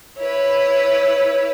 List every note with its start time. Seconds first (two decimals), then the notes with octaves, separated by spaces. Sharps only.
0.18 E4 B4 C#5